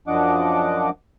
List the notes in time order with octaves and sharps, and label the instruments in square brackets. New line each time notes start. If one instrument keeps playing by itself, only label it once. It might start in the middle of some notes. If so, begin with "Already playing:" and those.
[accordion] F#2 F3 D4 D#5 F#5 D6